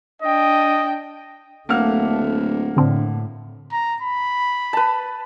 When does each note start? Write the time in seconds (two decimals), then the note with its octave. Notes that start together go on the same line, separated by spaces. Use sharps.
0.22 D4 D#5 G5
1.69 D1 D3 A3 A#3 F#5 F6
2.77 A2 D3 C4 D4
3.72 A#5
4.02 B5
4.73 B4 A5